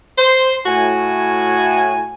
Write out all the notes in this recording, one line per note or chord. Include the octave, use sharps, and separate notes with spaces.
C5
A2 F#4 G#5